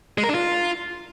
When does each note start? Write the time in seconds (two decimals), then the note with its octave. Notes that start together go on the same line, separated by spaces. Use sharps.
0.18 G#3
0.24 A#4
0.29 D4
0.34 F4